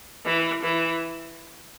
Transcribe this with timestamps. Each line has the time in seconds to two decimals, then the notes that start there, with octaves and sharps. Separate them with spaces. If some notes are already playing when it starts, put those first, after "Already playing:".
0.24 E3
0.63 E3